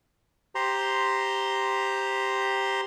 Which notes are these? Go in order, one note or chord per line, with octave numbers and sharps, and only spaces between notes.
G4 C5 A#5 C6